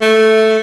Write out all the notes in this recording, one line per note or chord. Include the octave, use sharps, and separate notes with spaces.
A3